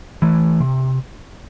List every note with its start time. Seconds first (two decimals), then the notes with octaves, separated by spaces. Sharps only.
0.22 E3 A3
0.60 C3